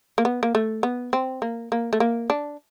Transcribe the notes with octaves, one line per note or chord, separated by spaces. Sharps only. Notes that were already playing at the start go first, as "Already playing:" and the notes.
A#3
B3
A#3
A3
B3
C4
A#3
A#3
A3
A#3
D4